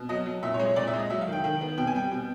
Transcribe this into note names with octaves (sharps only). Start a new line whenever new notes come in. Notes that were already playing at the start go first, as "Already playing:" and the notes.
Already playing: B2
F#3 D#5
F#3
A#2 E5
C#5
G#3
C#5
A#2 D5
E5
G#3
D#5
F#3 E5
F5
D#3
G5
D#3 G5
B3
B2 G5
G#5
G3 G5
B2